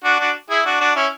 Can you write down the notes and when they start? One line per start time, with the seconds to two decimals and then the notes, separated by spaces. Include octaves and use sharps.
0.04 D4 F#4
0.19 D4 F#4
0.50 E4 G#4
0.65 D4 F#4
0.80 D4 F#4
0.96 C#4 E4